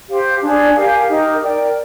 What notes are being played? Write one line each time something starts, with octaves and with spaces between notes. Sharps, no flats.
G4 C5 F5
D4 G#4 D5
G4 A#4 F5 G#5
D#4 G4 A#4 D#5
A#4 D5 G5